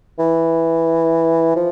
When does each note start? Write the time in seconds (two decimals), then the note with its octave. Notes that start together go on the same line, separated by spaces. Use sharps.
0.19 E3
1.56 F3